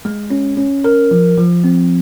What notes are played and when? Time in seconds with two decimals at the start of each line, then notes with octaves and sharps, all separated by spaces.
0.05 G#3
0.30 C#4
0.57 C#4
0.84 A#4
1.11 F3
1.38 F3
1.64 C4